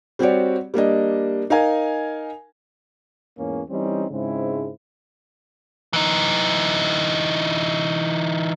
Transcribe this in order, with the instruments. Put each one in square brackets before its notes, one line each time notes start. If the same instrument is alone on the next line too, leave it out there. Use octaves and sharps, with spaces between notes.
[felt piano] G3 C4 F#4 G4 C#5 D5
G3 A#3 D4 D#5
D#4 A#4 F5 G#5
[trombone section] E2 G#2 A#3 C#4
E3 G3 C4 C#4 D#4
G#2 C#3 G#3 C4 E4
[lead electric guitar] E3 D#4